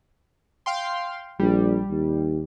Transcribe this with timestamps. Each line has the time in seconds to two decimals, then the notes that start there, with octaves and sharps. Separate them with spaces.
0.66 F5 G5 C6
1.39 A#1 G3
1.91 D#2